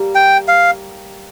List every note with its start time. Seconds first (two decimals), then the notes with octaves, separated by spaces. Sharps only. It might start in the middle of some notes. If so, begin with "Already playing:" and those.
Already playing: G3 A#3 G4
0.15 G5
0.48 F5